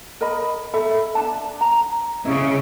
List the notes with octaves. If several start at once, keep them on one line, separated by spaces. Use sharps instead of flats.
A#4 D#5 B5
A4 E5 B5
D4 A5
A#5
C#3 E4 D#5